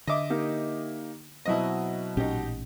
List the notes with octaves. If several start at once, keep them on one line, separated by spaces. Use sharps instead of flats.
D3 D#5 E5 D6
A#3 D#4 G4
B2 F#3 C4 E4 D#5
A1 A#2 C#4 D#4 G4